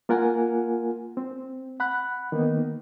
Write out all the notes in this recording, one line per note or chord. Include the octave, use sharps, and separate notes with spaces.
A#3 F4 A#4 F#5 G#5
C4
F#5 B5 F#6
D#3 A#3 B3 D#4